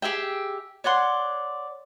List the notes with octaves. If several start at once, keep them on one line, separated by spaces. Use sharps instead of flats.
G4 G#4 E5 G5
C#5 D5 F#5 C6